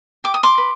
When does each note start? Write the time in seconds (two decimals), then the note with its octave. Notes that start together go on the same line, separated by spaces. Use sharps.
0.24 G4 D6
0.34 D#6
0.43 C6 D6
0.58 B4